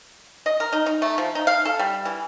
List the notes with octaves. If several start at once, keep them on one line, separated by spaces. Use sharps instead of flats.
D#5
A#4
D#4
D#4
A3
F3
D#4
F5
A4
G3
E3